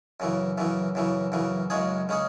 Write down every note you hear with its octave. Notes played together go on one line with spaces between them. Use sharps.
F#2 C#3 E3
F#2 C#3 E3
F#2 C#3 E3
F#2 C#3 E3
F#2 C#3 G#3 C#4 G#4
C#3 G#3 C#4 G#4